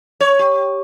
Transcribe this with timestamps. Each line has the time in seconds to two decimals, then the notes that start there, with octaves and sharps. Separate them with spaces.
0.20 C#5
0.39 G4